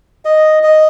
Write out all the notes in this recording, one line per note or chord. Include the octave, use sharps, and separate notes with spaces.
D#5
D#5